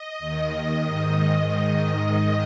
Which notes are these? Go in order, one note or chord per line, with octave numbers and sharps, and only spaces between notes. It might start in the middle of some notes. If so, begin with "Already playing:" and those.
Already playing: D#5
D#2 D#3
G#2 D#3